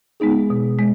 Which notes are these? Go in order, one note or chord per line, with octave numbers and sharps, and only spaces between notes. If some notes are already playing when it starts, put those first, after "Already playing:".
G#3 B3 D#4 G#4
B2
G#3